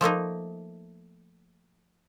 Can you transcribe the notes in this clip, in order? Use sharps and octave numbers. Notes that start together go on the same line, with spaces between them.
F3 A3 A#3 D#4